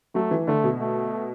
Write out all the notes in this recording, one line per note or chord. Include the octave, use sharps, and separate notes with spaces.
F#3 A3
E3
D3 A3
B2
A3